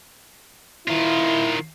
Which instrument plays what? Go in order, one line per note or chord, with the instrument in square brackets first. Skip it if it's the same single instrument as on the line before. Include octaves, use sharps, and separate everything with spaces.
[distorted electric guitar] D#3 F4 [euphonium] E4